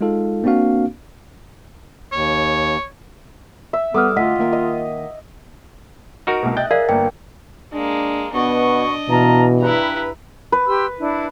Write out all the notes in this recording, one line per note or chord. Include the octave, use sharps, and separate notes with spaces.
G#3 D#4 F4 A4 F5
A#3 C4 D4 F#4 F5
D#2 C#5
E5
G3 B3 A4 D6 D#6 F6
D2 F4 D#5 F#5 B6
D#3 A#3 E5
D#5
D#4 F#4 A#4 F6 D7
C2 B2
D#5 E5 G5 F#6 A6
G#4 A#4 D5 F5
G1 A#3 G5
G#3 A#3 D4
B2 B3 D4 D#5 C#6
B2 E3 F5 A5 A#5
G2 E4 B4 A#5
B4
G4 C6 E6
D4 E4